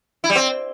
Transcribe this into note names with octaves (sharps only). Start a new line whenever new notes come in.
E4
G3
C4